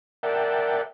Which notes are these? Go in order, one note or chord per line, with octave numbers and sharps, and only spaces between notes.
A#4 D5 E5 F#5 G5 A5